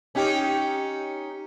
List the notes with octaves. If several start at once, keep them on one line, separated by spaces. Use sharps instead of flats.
C#4 D#4 G4